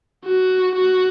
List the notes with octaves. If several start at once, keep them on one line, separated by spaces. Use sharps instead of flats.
F#4
F#4